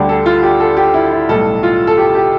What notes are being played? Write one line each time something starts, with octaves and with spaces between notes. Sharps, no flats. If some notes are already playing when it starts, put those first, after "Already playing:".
Already playing: D2 D3 G3 G4
A4
F4
G4
A4
G4
E4
E4
B1 A2 G3 A4
F4
A4
G4
G4